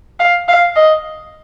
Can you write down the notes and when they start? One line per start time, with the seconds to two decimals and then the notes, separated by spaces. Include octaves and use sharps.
0.19 F5
0.48 F5
0.76 D#5